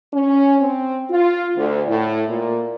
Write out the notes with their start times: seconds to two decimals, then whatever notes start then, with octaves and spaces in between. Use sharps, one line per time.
0.13 C#4
0.61 C4
1.10 F4
1.57 D2
1.87 A2
2.28 A#2